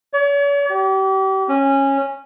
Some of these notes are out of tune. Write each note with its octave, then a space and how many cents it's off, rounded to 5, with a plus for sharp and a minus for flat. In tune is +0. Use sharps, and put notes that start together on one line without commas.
C#5 +45
G4 -35
C#4 -15